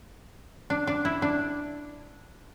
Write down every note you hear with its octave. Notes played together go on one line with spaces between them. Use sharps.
D4
D4
E4
D4